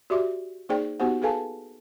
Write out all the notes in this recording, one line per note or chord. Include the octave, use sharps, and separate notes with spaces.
F#4 G4 D5 E5 C6 D6
A#3 D#4 G#4 C5 D5 G5
B3 D#4 F#4 G4 C5 F#5
G#4 A4 B4 F5 G#5 A5